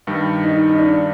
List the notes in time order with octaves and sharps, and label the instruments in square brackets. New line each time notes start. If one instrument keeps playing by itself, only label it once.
[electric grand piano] G2 D#3 G3
[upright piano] D#4
D#4
D4